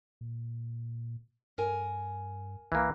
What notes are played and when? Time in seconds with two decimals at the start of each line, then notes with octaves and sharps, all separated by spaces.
0.21 A#2
1.58 G2 A#4 G#5
2.72 C2 E3 A#3